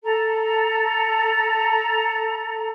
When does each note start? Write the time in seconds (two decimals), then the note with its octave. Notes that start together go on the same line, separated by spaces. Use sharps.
0.04 A4 A#5